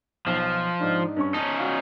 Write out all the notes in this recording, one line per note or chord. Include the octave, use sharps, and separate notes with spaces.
B1 F3
G#2 D4 D#4
G2 C#4 C#6
C#4 D#4 A5
F#4 F5